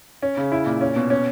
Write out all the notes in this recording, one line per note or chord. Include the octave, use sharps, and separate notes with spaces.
C#4
C#3
E4
A#2
C#4
B2
C#4